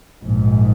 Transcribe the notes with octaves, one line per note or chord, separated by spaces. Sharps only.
A#1 G#2